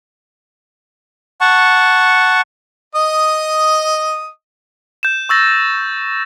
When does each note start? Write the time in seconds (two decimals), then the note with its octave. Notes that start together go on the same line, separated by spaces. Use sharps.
1.41 F#5 A5 C#6
2.95 D#5 D#6
5.03 G6 E7
5.29 C#6 E6 A6 A#6